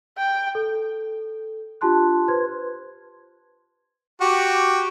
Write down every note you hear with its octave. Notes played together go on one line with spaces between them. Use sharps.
G5
A4
D4 F4 G4 A5 C6 F#6
B4 C5 C6 G#6
F#4 G4